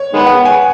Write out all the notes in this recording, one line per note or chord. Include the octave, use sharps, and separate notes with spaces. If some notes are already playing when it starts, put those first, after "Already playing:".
Already playing: C#5
D#3 G#3 B3
F#5
G#5